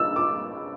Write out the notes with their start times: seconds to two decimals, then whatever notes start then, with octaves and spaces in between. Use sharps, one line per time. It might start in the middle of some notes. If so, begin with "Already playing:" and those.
Already playing: E6
0.16 D6